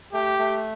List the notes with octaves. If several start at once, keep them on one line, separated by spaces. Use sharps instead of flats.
A3 G4
A3